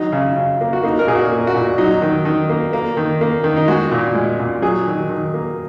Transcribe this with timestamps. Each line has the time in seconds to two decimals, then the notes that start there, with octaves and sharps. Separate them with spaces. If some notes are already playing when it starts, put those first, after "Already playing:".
Already playing: D#3 F#3 D#4
0.12 C#3
0.36 C#3
0.61 A#3
0.73 F#4
0.83 A#3 D#4
0.99 A#4
1.07 A#2 G#4
1.16 F#4
1.32 A#3
1.47 F#4
1.55 A#2
1.78 F#3 D#4
2.02 D#3
2.25 D#3
2.50 A#3
2.73 A#3
2.97 D#3
3.21 A#3
3.44 D#3
3.57 D#4
3.68 G#3 F#4
3.91 A#2
4.15 G#3
4.39 A#2
4.62 F#3 G#4
4.86 D#3
5.09 D#3
5.34 A#3